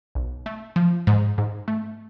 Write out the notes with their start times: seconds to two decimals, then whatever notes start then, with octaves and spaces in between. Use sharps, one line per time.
0.15 B1
0.46 A3
0.76 F3
1.07 G#2
1.38 G#2
1.68 A3